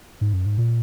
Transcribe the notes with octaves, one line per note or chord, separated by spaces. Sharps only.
G#2
F#2
G#2
A#2